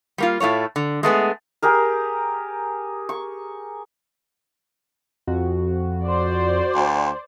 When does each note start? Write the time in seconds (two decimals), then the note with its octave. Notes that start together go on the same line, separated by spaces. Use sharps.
0.18 G3 A#3 F4
0.40 A2 A3 F4 C#5
0.76 D3
1.03 G#3 A3 B3 G#4
1.62 G4 G#4 A#4
3.09 C#6
5.27 F2 F#4
6.04 C5 D5
6.75 D2